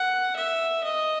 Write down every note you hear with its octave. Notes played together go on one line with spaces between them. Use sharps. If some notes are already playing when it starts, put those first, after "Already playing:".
Already playing: F#5
E5
D#5